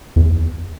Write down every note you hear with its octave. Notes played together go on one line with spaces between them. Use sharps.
E2